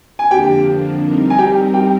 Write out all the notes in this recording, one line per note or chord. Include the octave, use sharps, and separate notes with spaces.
G#5
F2 D3 F3 A#3 D4 G4 G5
G3 C4 D#4 A#4
G#5
G4 G5
G4 G5